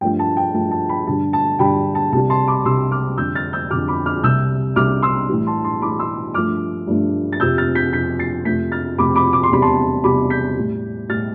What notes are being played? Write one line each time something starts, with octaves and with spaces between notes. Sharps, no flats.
G2 F3 A3 G5
A5
G5
G2 F3 A3 A5
A5
G5 B5
G2 D3 G3 A5
A5
G2 D3 G3 G5 B5
A5
C2 C3 G3 A5
A5 C6
B5 D6
C2 C3 G3 C6 E6
D6 F6
F2 D3 G3 E6 G6
F6 A6
E6 G6
F2 D3 G3 D6 F6
B5 D6
D6 F6
C2 C3 G3 E6 G6
C2 C3 G3 D6 F6
C6 E6
A2 E3 G3
A5 C6
A5 C6
A2 E3 G3 B5 D6
C6 E6
G2 F3 A3 D6 F6
G2 F3 A3
A6
F2 C3 F3 E6 G6
F6 A6
G6 B6
F2 C3 F3 G6 B6
A6 C7
F2 C3 F3 A3 G6 B6
F6 A6
F2 C3 F3 A3 B5 D6
B5 D6
D6
C6
E2 C3 G3 B5
A5 C6
E2 C3 G3 B5 D6
G6 B6
A2 G3
A2 G3 F6 A6